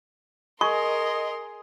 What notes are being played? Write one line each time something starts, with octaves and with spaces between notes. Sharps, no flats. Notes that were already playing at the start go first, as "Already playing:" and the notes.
G#4 A#4 D#5 C6 C#6